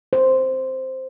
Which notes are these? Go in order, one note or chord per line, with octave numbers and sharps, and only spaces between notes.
C5